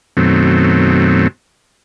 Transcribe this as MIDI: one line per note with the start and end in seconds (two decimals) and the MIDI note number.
0.17 1.28 42
0.17 1.28 47
0.17 1.28 51
0.17 1.28 54
0.17 1.28 57
0.17 1.28 60